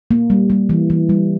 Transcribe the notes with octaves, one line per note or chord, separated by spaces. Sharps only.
A#3
G3
G3
E3
E3
G3